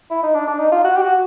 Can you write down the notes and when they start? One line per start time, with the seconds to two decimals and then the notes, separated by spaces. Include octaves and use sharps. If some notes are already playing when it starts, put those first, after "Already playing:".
0.11 E4
0.23 D#4
0.35 D4
0.47 D4
0.59 D#4
0.72 F4
0.84 F#4
0.97 G4
1.02 F#4